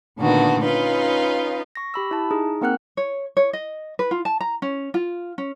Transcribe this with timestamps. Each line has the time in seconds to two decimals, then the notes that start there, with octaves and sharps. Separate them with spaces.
0.18 A#2 D3 D#3 A3 B3 F#4
0.64 C#4 D#4 F4 B4
1.75 C#6 A#6
1.94 G4 B5 E6
2.11 E4 A5
2.31 D#4 G#4
2.61 A#3 C4 A#4 F#5 F6 F#6
2.97 C#5
3.37 C#5
3.53 D#5
3.99 B4
4.11 F4
4.25 A5
4.41 A#5
4.62 C#4
4.94 F4
5.38 C#4